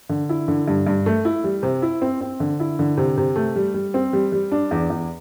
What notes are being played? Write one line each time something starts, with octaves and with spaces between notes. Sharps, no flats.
D3
E4
D3
G2
G2
A3
E4
G3
C3
E4
C4
C4
D3
E4
D3
C3
C3
A3
G3
G3
C4
G3
G3
D4
E2
E2